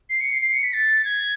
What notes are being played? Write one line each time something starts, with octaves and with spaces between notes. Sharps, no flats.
C7
C#7
C7
C7
C#7
B6
A6
G#6